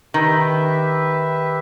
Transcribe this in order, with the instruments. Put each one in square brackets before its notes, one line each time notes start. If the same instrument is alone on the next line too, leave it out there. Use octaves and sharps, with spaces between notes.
[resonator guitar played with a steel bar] D#3 [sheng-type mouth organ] G4 B4 E5